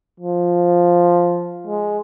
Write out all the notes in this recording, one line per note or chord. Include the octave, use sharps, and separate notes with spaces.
F3
G#3